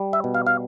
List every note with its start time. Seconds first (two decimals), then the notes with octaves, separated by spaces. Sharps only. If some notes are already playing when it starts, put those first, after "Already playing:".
Already playing: G3
0.13 E5
0.24 B2
0.34 F5
0.46 F5